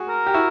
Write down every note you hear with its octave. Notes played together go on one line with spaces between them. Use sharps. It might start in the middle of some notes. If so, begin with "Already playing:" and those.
Already playing: F#4 G#4
A#4
G4
E4 F#4